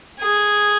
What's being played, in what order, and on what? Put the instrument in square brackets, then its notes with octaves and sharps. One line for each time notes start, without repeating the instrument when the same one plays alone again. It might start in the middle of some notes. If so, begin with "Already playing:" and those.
[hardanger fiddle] G#4